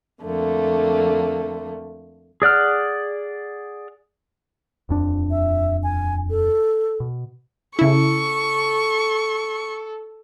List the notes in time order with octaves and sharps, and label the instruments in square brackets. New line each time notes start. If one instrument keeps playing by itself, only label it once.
[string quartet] F2 D3 A3 A#3
[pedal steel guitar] G#4 D5 F#5 F6
[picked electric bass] D#1 F2 D4
[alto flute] E5
G#5
A4
[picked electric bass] B2
[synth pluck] C#3 E4 [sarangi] A4 [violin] C#6